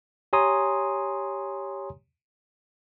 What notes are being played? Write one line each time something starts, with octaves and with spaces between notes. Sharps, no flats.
G4 C#5 G#5 A#5 C6 D#6